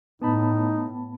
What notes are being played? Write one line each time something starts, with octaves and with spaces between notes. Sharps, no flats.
A2 B3 D#4 A5 B5